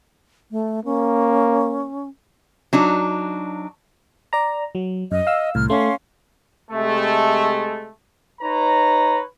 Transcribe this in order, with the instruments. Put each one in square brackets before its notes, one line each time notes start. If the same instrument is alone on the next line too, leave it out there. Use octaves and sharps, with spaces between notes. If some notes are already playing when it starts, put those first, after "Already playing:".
[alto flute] A3
[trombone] A#3 [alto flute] C#4
[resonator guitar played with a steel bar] F#3 D4 D#4
[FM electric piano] D5 A#5
F#3
[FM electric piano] F#2 [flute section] D#5
[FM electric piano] F5 E6
[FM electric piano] C2 A2 [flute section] F6
[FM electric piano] A3 [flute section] C#4 F5 C6
[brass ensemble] C3 G#3 A3
D#4 B4 C#5 A#5